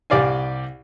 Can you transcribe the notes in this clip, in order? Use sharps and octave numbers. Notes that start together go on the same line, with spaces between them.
C2 G4 D5 F5 G#5